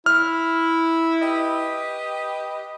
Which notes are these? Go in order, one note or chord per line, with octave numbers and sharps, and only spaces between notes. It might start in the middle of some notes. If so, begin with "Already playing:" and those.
E4 F6
G4 B4 D#5